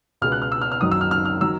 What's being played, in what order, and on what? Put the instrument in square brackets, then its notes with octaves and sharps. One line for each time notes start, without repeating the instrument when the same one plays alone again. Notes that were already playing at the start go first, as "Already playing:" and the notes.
[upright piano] C#2 B2 G#3 B3 F6
F#6
F6
E6
F6
F6
F#1 F#2 D#3 F#3 D#6
E6
F6
F6
F6
D#3 F#3 E6